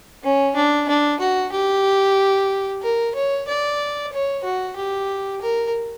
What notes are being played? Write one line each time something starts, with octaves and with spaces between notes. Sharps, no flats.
C#4
D4
D4
F#4
G4
A#4
C#5
D5
C#5
F#4
G4
A#4